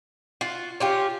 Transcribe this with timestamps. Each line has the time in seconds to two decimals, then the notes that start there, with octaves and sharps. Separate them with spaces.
0.41 F4 F#4
0.80 C#4 F4 G4